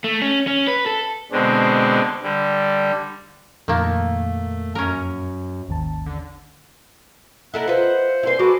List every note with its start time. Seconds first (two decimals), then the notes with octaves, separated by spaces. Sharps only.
0.04 A3
0.22 C#4
0.47 C#4
0.67 B4
0.86 A4
1.32 B2 D3 G#3 C4 D4
2.23 D3 G3
3.68 F2 A#2 D#3 A3 A#3
4.75 F#2 C#4 A#4
5.68 G#1 D#2 A5
6.06 D3
7.54 E4 A4 A#4 D#5 E5 F#5
7.68 F4 B4 C5
8.23 C2 E4 B4 C6
8.39 G#3 F#4 A4 B4 D6